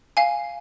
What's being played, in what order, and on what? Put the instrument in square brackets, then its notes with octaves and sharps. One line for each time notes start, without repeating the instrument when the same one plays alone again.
[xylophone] F5 G#5